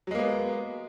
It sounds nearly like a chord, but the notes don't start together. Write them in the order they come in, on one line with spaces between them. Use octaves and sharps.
F#3 G#3 A#3 B3